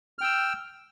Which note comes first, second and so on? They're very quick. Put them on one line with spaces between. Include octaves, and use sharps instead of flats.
F6 G5 E6